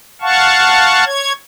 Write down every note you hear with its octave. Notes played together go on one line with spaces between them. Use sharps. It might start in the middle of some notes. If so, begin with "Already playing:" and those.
F5 F#5 A5 C#6
C#5 G#6